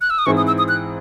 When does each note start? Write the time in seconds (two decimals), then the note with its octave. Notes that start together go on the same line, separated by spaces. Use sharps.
0.01 F#6
0.10 E6
0.18 D#6
0.26 G#2 E3 C4 E4 G#4 C#6
0.37 D#6
0.47 E6
0.58 D#6
0.69 F#6